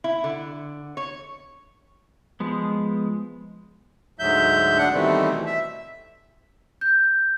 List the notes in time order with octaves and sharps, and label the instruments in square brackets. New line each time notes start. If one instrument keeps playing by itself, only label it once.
[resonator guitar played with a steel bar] E4
D3
C#5
[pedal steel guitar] F3 G#3 B3
[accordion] D2 G#2 F#3 E5 G6
D4 F#5
B2 D#3 E3 G3 A3 C4
E5
[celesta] G6